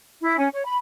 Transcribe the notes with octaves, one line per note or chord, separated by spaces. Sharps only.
E4
C#4
C#5
B5